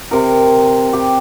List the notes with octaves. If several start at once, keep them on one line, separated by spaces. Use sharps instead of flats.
C3 A#4
G4